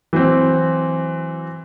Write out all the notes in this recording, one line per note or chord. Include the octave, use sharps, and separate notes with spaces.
E3 F#3 C4